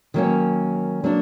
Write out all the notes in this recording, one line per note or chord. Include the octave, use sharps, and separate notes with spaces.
D#3 F#3 A#3 C#4
F#3 A#3 D4